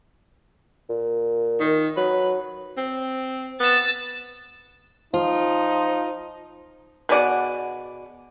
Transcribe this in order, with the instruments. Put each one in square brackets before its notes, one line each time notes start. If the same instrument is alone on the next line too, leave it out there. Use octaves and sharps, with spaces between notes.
[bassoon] A#2
[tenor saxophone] D#3
[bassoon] F#3 [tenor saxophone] B4
[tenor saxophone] C4
[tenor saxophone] B3 [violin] E6 A6
[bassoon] F3 [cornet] D#4 [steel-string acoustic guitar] F4
[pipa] B2 G#4 D5 F#5